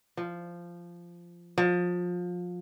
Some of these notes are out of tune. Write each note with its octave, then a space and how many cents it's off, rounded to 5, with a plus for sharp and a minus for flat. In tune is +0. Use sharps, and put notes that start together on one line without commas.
F3 -10
F3 +25